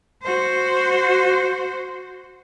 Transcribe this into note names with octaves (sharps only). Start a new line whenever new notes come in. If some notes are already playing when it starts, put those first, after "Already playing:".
F#4 C5